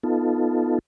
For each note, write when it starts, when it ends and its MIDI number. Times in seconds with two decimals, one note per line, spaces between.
0.03 0.79 59
0.03 0.79 63
0.03 0.79 65
0.03 0.79 69